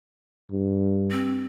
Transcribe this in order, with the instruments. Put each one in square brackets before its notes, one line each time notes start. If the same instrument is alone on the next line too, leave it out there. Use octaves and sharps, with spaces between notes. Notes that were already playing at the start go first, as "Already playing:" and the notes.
[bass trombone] G2
[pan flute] C4